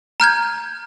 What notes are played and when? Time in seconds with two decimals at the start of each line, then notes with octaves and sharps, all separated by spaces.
0.20 A#5 F6 G6 G#6